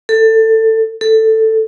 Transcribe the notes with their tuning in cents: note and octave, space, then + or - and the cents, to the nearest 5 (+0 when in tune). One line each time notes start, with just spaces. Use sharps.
A4 +20
A4 +10